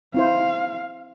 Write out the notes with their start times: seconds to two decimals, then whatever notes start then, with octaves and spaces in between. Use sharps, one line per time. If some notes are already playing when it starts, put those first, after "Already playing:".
0.14 C4 E4 C5 F5